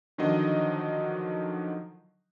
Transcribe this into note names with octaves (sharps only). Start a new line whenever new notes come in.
D3 D#3 F3 F#3 D#5